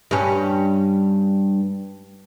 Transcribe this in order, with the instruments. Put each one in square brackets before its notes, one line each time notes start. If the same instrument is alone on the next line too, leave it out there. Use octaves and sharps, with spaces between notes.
[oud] G2 C#4